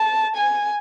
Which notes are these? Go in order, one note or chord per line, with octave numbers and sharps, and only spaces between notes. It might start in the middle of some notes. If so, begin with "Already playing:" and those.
Already playing: A5
G#5